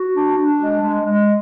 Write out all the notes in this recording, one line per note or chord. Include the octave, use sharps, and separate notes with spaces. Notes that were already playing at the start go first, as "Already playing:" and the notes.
Already playing: F#4
D4
D4
G#3
G#3
G#3